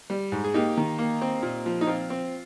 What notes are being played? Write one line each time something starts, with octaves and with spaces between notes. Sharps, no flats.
G3
G#2
G#4
A#3 D#4 G4
D#3
A#3
C4
A#2
F3
D#4
C4 F4
C4